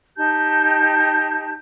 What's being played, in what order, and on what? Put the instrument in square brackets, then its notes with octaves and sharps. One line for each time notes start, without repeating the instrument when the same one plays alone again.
[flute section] D#4 G4 A5 G6